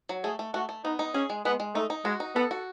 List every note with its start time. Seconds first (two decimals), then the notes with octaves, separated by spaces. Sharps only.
0.09 F#3
0.24 A3 G#4
0.39 A3
0.54 A3 F#4
0.69 A3
0.84 B3 D#4
0.99 D#4
1.14 C#4 G#4
1.30 G#3
1.45 G#3 B3
1.60 G#3
1.75 A3 D#4
1.90 D#4
2.05 G#3 F#4
2.20 D#4
2.35 B3 A4
2.51 F#4